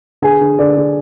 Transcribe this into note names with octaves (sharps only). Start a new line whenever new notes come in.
D3 G#4 G#5
D3
D3 D5
D3